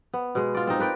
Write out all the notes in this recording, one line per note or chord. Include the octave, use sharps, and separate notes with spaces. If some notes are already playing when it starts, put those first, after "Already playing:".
B3
B2 G#3
F4 D5
C4 D#4
A#4 B4 D5 G5